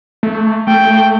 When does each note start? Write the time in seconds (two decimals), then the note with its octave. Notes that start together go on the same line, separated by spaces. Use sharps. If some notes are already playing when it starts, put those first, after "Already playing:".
0.23 A3
0.67 A3 G5